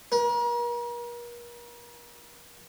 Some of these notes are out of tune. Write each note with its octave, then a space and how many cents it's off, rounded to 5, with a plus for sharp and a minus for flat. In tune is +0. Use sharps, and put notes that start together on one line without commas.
A#4 +40